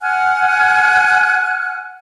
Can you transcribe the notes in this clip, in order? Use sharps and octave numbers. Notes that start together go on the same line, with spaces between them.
F#5 G#5 F6 F#6